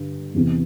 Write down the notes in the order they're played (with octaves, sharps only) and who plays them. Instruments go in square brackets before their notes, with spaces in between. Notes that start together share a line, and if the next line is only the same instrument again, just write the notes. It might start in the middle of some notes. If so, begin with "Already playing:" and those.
Already playing: [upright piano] G2 D3
E2 C3 E3